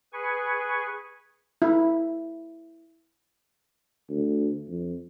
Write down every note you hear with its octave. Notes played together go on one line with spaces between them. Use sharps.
G#4 B4 G#5 C#6
E4
D2
F2